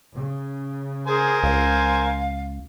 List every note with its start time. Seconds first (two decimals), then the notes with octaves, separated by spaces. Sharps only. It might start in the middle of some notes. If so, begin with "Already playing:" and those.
0.15 C#3
1.07 G#4 A#4 C5 G#5
1.43 C#2 F5